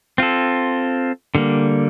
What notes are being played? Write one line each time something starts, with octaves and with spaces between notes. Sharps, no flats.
C4 F4 A4
D3 G3 A#3